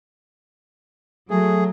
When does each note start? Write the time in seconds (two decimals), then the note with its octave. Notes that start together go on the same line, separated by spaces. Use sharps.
1.30 F#3 A3 G#4